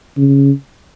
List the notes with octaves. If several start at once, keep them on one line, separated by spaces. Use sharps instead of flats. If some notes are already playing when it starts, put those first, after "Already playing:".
C#3